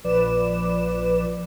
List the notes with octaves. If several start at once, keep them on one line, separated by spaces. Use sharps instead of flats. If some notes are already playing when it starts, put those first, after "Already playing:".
A#1 F3 B4 D5 D6 E7